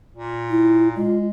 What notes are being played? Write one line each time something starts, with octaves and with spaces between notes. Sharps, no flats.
A#2
E4
G#3 F4